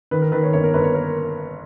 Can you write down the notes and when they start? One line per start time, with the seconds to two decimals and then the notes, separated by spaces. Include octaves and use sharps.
0.11 D#3 B4
0.22 A#4
0.32 D#3 B4
0.43 C#5
0.53 G1 C#5
0.64 A#4
0.74 G1 B4
0.84 C#5
0.95 A#4